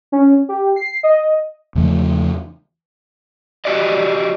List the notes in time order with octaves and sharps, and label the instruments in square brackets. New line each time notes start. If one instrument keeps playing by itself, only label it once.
[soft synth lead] C#4
G4
C7
D#5
[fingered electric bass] E2 C#3 F3 A3
[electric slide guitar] F#4 G4 D5 D#5